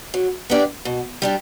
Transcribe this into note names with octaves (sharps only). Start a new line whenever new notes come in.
F#3
B3 D4 G4 D5
B2
G3 D4 G4